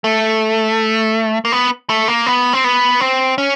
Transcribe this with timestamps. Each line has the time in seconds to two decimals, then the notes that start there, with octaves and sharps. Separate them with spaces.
0.04 A3
1.45 A#3
1.52 B3
1.90 A3
2.08 A#3
2.26 B3
2.53 C4
2.64 B3
3.00 C4
3.38 C#4